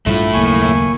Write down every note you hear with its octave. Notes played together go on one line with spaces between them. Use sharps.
A#1 G2 F3 A3 E4 F4
F#1 D#2 A#3 G#5 C#6